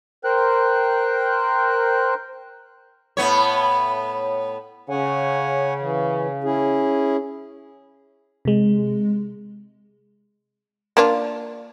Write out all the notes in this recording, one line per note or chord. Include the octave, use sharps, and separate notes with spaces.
A#4 C5 G5 F#6
A2 B3 C#5
C#3 C#5 F#5 G#5
E3
C#4 E4 G#4
C3 G#3
A#3 D4 F4